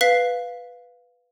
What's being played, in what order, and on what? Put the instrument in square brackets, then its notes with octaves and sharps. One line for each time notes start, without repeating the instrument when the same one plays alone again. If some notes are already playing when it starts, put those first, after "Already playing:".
[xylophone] B4 F5 B6